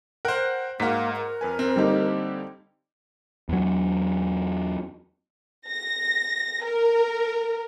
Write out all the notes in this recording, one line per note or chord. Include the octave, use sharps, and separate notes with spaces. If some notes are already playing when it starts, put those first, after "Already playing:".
A#4 C5 F#5 G5 F#6
G#2 A#3 F#4 A#5 F6 B6
A#4
F2 B4 G#5
C4
D3 G3 A#3 D#4 G4
E2 F#3
A#6
A#4